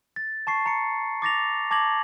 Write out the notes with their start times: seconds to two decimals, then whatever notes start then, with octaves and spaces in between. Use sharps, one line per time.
0.16 A6
0.47 A5 C#6 C7
0.66 A#5 C#7
1.22 D6 A6 A#6 F7
1.71 A5 D6 G#6 A#6 F#7